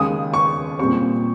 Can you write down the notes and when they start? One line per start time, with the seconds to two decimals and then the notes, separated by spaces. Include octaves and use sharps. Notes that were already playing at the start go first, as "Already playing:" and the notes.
Already playing: D#2 C#3 G#3 D#6
0.34 C#6
0.79 A#2 G3 C4 C#6